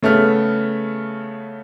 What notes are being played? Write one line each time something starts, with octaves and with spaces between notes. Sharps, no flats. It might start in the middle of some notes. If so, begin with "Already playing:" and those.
C#3 A3 B3 F6